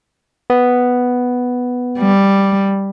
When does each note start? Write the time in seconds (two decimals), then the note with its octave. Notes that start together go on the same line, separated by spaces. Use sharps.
0.50 B3
1.99 G3